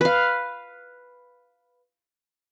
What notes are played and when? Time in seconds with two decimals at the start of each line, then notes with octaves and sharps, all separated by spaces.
0.01 B4 F5